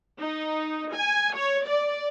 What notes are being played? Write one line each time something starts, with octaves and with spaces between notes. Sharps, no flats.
D#4
G#5
C#5
D5